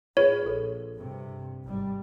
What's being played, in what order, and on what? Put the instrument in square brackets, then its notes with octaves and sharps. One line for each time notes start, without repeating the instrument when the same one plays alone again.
[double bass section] A2 [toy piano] F4 G#4 B4 [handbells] C#5
[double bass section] A#1 [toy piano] A4
[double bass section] G2 C3
G#1 G3